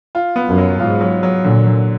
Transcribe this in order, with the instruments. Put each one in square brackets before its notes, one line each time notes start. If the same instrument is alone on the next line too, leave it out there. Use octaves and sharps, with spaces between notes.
[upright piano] F4
B3
[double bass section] F#2
[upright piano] F#3
[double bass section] G#2 [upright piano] F4
[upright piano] F#3
F#3
[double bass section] A#2 [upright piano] D3
[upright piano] D3